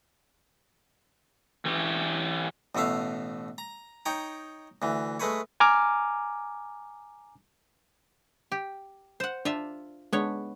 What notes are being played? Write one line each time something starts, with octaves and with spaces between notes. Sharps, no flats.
E3 G4
A1 B2 A3 E5 F5
A#5
D#4 C#5 G5 A#5
D2 E3
G#3 A3 B4 C#5
G#5 A#5 D6 F6
G4
C5 F#5
D4 F4 E5
G#3 B3 D4 C#5